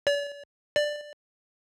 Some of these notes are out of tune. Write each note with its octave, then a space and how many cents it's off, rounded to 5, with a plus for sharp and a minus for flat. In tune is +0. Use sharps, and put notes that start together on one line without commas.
D5 -45
D5 +10